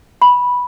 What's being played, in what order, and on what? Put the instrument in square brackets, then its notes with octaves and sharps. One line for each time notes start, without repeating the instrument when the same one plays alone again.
[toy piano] B5